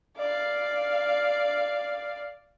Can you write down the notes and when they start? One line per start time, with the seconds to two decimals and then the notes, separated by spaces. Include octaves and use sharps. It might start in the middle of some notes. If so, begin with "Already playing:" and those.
0.18 D5 F5